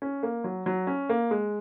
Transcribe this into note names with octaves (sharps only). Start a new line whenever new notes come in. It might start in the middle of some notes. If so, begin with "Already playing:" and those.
C#4
A#3
F#3
F#3
C#4
A#3
G#3